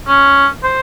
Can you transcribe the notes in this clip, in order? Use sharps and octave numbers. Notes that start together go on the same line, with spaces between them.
C#4
C5